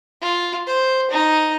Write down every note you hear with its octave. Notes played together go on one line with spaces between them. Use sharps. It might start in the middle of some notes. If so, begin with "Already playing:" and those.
F4
C5
D#4